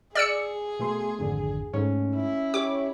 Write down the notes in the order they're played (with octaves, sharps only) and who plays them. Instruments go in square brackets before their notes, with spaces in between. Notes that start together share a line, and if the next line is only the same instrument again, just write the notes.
[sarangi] G#4 [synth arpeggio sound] D5 E6 C#7
[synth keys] B2 A3 C6
[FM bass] G#1 [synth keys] F2 D3
[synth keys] G#2 A3 [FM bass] C#4
[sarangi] E4
[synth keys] G4 C#5 [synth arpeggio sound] D6